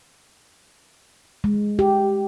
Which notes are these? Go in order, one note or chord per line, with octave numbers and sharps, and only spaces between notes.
G#3
G4